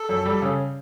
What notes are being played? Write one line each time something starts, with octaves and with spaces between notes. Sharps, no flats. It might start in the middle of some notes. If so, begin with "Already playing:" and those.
Already playing: A4
F#2
G3
C#3